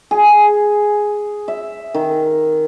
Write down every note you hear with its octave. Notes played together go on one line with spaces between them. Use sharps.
G#4
E5
D#3